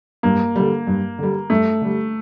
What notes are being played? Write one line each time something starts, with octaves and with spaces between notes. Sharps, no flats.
G2 A#3
D3 G3
G2
D3 G3
G2 A3
D3 G3